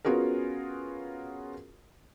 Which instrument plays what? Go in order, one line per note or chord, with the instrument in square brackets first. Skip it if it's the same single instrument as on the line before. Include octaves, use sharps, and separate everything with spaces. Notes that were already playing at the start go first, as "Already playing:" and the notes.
[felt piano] B3 C#4 F4 F#4 G#4 A#4